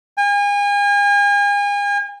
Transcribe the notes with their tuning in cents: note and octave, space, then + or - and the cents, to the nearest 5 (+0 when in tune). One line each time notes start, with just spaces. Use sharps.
G#5 -40